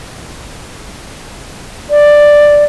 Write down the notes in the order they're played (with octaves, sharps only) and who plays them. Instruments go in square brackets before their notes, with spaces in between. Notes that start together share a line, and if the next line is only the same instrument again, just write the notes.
[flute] D5